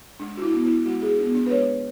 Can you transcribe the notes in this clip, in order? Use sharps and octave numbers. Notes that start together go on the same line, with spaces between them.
G#3 D4
F#4
E4
B3 D4
E4
G#3 F#4
G#4
B3 D4
D4
B4
G#3 C#5